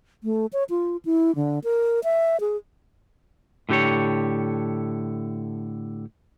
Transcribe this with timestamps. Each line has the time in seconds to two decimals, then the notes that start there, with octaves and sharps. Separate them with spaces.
0.24 A3
0.53 C#5
0.70 F4
1.05 E4
1.35 D3
1.64 A#4
2.04 E5
2.40 G#4
3.69 A2 D3 G4 A4 C#5